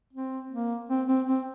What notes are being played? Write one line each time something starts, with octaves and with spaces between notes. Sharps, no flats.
C4
A#3
C4
C4
C4